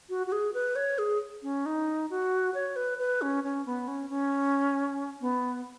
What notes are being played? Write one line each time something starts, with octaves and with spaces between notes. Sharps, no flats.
F#4
F#4
G#4
B4
C#5
G#4
C#4
D#4
F#4
C#5
B4
B4
C#4
C#4
B3
C#4
C#4
B3